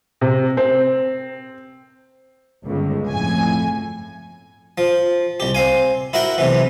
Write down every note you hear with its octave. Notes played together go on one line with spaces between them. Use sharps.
C3
C4
G1 C#2
F2 A2 G#5
F3
C2 G4
C4 F5 G#5
E4 F#4 A#4 E5 F#5 G5
B1 C3 E3